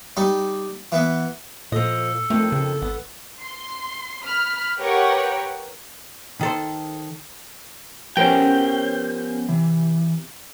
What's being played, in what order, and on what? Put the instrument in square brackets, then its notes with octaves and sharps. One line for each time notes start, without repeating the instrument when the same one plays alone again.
[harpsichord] G3 D#4
E3 B3
[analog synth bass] A#2 [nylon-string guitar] F3 D#5 [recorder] A4
[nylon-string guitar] F2 D#3 [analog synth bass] A3
[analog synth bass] C#3
[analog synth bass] G#1 [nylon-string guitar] B3
[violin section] C6
B5 F6
G4 A#4 B4 C#5 F#5 G5
[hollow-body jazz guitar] D#3 A4 C5
[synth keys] F3 B3 C#4 [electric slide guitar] G4 A#4 C5 [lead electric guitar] G5
[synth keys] C3 [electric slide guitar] E3